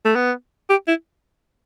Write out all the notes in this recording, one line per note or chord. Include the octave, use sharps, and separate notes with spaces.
A3
B3
G4
E4